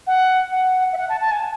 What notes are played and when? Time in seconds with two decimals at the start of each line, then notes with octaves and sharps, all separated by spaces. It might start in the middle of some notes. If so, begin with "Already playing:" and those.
0.07 F#5
0.52 F#5
0.93 E5
0.97 F#5
1.09 A5
1.21 A5
1.31 G#5